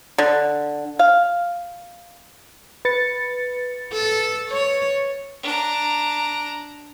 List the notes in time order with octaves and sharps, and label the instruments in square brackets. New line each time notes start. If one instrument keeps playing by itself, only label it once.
[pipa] D3
F5
[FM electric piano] B4 A6 C#7
[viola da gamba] A4
C#5
[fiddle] D4 A#5